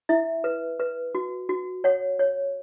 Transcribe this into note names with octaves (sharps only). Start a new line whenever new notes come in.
E4 E5
B4
B4
F#4
F#4
C#5 F#5
C#5